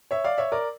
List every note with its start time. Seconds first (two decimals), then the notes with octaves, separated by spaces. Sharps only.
0.11 C#5 E5
0.24 D5 F5
0.38 C#5 E5
0.52 A#4 D5